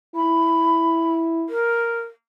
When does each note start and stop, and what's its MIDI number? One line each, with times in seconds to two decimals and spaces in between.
0.16 1.49 64
0.16 1.16 83
1.49 2.00 70